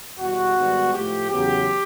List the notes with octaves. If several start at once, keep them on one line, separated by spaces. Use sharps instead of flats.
E2 B2 G3 F#4
G#2 D#3 G3 B3
A2 F3 A3 G4
E2 C#3 F#3 B3 G4